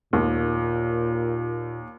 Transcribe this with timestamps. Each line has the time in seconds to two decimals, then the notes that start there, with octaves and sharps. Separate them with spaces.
0.13 D#2 A#2